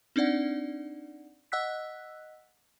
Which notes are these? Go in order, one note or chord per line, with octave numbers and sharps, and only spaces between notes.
C4 D4 D#4 D5 F#5
D#5 F#5 E6 F#6 B6